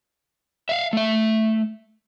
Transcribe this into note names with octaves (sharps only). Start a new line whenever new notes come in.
E5 F5
A3 E5